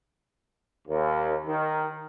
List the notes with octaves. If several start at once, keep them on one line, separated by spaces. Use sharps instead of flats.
D#2
D#3